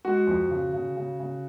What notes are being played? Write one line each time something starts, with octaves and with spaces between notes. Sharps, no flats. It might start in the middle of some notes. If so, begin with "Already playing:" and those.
G#3 F#4
F2
C#3
C#3
C#3
C#3